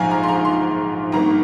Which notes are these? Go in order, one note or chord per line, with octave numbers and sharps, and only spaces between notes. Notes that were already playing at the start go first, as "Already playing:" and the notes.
Already playing: A#1 G#2 F3 F5 G#5 A#5
A#5
C6
A#5
C6
G#1 G2 D#3 A#3 A#5